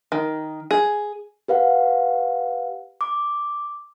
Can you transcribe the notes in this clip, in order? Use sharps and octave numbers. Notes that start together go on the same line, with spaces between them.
D#3
G#4
G4 B4 F5 F#5
D6